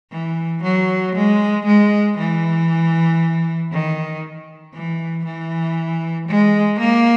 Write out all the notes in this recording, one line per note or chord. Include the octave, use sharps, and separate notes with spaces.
E3
F#3
G#3
G#3
E3
D#3
E3
E3
G#3
A#3